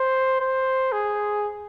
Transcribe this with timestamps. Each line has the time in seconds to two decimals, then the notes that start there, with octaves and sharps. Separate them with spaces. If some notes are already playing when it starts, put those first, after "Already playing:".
Already playing: C5
0.40 C5
0.93 G#4